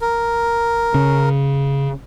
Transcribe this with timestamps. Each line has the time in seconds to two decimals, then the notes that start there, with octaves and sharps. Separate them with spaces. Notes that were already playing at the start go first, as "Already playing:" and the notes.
0.01 A#4
0.94 C#3